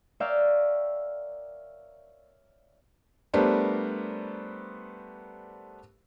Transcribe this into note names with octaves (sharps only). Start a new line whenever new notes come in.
A#4 C#5 D5 E5 F5 G5
G3 A3 B3 D4 A#4 C5